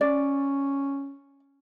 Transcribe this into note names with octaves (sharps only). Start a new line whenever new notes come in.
C#4 D5